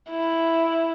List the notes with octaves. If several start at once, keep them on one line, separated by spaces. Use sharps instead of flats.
E4